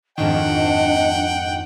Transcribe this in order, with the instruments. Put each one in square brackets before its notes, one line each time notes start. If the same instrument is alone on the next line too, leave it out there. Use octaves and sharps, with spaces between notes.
[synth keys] F2 G#2 D#3 [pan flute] D4 [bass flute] D#5 [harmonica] F#5 G5